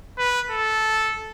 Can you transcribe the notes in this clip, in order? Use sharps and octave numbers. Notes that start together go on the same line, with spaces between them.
B4
A4